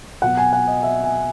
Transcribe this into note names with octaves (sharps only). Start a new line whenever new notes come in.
B2 F#3 B3 F#5
G#5
F#5
D#5
E5
G#5